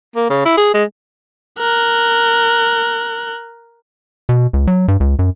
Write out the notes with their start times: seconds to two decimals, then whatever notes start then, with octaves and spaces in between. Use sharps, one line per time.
0.16 A#3
0.30 C#3
0.46 E4
0.57 G#4
0.74 G#3
1.59 A#4 F#6
4.29 B2
4.53 C#2
4.67 F#3
4.88 G2
5.00 C#2
5.19 F#2